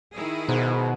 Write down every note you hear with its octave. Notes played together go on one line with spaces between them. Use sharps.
D#3 E4 G#4
G#2 B2